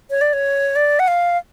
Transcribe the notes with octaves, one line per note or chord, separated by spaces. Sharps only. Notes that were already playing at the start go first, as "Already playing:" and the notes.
C#5
D5
C#5
D5
F#5
F5